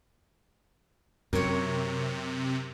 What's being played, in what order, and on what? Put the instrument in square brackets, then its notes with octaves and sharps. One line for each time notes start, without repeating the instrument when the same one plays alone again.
[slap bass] F#2 [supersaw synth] C3 [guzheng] A#4 C#5